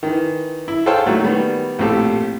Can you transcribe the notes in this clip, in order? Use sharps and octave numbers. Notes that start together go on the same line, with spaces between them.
D#3 E3
E4
G#4 A4 C5 C#5 F5 G5
A#2 D#3 F#3 A3
D#3 G3 B3
A#1 A2 C4 G4 A4